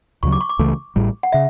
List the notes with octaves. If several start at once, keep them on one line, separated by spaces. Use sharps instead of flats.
D2 C#3 F#3 C#6
D6
C#6
D6
C#2 C#3 E3 A3
A1 A2 G3
F#5
C#3 E5